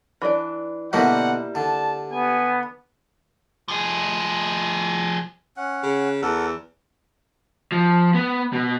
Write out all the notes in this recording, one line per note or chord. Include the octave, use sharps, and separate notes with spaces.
E3 D4 D5
B2 D3 G3 A#3 C4 E4 F#5
D3 A5
B3 G#5
F3 G#4
C#4 F#5
C#3
E2 A4 A#4 F#5
F3
B3
B2